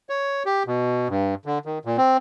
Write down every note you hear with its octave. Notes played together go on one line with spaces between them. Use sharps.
C#5
G4
B2
G2
D3
D#3
A#2
C4